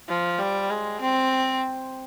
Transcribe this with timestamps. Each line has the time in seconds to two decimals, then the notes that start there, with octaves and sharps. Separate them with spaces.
0.08 F3
0.39 G3
0.70 G#3
1.01 C4